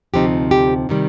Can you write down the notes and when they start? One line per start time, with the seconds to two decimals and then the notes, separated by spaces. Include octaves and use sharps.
0.14 D2 C3 F3 C4 D#4 G4
0.51 G4
0.89 C3 D#3 G3